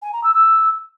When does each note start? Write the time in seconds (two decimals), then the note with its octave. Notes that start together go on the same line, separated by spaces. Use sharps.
0.02 G#5
0.12 A#5
0.23 E6
0.34 E6